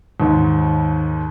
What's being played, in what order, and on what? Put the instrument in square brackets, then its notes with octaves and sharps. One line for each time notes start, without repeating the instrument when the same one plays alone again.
[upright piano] D#2 G#2 D#3